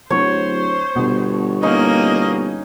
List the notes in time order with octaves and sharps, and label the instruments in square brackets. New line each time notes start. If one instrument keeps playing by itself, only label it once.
[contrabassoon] D1 [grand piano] F#3 [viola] C5 [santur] C#5
[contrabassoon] G1 [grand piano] B2
[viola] A#3 D#5 [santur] C#4 D#4